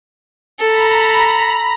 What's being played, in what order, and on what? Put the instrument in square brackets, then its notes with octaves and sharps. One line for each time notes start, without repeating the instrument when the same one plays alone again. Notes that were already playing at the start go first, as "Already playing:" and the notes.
[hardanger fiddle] A4 [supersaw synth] A#5 B5